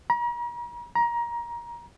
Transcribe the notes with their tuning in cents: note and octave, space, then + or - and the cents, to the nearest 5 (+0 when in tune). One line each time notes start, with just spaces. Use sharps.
A#5 +40
A#5 +20